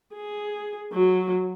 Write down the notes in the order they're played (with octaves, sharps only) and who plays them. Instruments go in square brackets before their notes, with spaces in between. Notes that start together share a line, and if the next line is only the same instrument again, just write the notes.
[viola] G#4
F#3